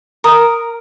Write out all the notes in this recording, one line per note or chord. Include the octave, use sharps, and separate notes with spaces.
A#4 D#6